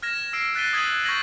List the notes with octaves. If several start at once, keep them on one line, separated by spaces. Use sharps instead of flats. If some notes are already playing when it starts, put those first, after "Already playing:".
F6 G#6 A#6 E7
E6 C7 D7
F#6 A6 B6 D#7 G7
D#6 G#6 B6 D#7 F#7
C#6 G6 G#6 A#6 F#7